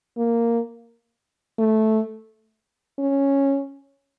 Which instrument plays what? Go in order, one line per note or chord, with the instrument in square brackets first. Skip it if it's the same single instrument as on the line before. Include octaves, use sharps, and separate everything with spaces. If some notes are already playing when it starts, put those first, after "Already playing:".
[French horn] A#3
A3
C#4